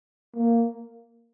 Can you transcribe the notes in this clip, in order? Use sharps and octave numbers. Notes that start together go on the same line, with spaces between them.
A#3